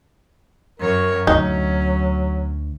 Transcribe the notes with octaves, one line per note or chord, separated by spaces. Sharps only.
F#2 A#4 C#5
D2 F#3 C#4 D#4